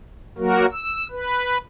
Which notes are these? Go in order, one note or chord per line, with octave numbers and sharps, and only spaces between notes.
F#3 A#3 F#4 A#4
E6
B4